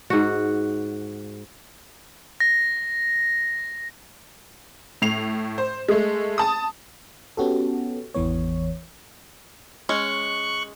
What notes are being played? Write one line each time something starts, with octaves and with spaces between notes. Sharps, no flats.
G#2 F#4
A#6
A2 C7 F7
C5
G#3 A3
A5 D#6
B3 C#4 F#4 G4 A4
G#1 E2 E3 B3 C#5
G#3 C#4 C#6 F#6